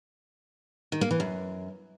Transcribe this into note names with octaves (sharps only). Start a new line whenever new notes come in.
D#3
A#3
E3
F#2